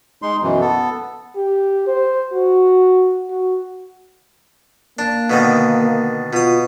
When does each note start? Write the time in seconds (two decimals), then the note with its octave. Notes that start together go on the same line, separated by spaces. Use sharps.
0.22 G#3 D#4 C6
0.42 F#2 B2 E3
0.61 B3 A4
1.36 G4
1.87 C5
2.33 F#4
3.31 F#4
4.99 A#3 D4
5.30 B2 D3 D#3
6.33 B2 F4 D#6